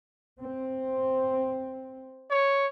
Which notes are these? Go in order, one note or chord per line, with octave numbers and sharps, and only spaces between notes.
C4
C#5